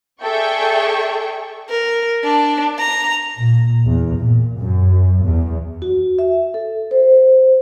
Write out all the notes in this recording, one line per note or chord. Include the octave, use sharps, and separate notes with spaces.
G#4 A4 D5 E5 G5 C#6
A#4
D4
A#5
A#2
E2
A#2
F#2
E2
F#4
E5
A4
C5